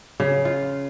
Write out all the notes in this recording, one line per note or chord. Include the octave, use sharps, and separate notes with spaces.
C#3
F4